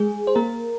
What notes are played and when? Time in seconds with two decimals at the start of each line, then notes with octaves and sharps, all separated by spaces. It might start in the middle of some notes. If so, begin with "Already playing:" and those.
Already playing: G#3 G#4
0.27 C5
0.35 A#3 A#4